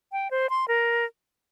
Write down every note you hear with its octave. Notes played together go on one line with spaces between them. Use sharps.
G5
C5
C6
A#4